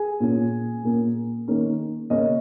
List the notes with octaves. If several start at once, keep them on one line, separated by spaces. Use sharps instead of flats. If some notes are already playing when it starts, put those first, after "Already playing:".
Already playing: G#4 G#5
A#2 A#3 C#4
A#2 A#3 C#4
D#3 A#3 C#4
C#3 A#3 C#4 D#5